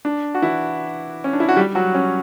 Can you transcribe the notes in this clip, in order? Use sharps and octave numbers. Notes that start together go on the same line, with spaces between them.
D4
F#4
E3 E4
C#4
D4
E4
F#4
G3 G4
F#3 F#4
C#4